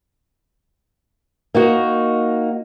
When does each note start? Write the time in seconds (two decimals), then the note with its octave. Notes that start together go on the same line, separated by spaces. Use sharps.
1.54 A#3 D#4 F#4